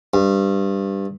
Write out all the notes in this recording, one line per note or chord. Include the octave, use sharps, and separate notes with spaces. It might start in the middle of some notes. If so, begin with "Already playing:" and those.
G2